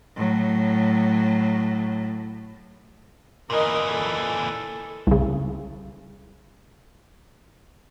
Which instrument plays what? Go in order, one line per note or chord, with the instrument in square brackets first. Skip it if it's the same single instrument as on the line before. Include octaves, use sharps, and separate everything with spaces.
[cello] A2 F#3
[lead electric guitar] A#2 E3 [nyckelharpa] A#4 D#5
[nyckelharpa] A4
[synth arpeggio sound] C2 C#3